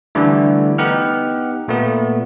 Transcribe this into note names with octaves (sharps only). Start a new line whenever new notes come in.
D3 E3 G3 A3
B3 D#4 G4 F#5 F6
A#2 A3 B3